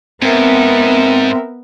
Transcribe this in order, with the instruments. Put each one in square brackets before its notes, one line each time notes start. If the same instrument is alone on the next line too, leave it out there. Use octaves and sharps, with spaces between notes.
[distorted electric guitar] G#2 [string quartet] B3 [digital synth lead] C4 [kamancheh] A#4 E5